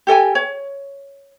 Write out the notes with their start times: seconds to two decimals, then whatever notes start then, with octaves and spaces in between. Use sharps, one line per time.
0.07 G4 A4 G5 G#5
0.35 C#5